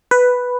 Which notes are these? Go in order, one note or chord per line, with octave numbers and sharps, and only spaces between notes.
B4